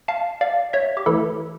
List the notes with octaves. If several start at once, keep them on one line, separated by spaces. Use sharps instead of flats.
F5 A5
D5 F5
C#5 E5
G4
E3 A3 E4 A4